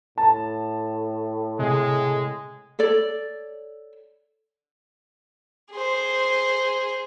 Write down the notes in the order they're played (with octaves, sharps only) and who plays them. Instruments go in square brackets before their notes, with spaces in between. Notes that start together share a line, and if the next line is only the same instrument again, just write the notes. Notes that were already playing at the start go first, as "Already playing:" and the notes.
[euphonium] A2 [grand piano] A5
[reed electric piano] C3 [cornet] G#3
[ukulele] A4 C#5 D5
[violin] G#4 C5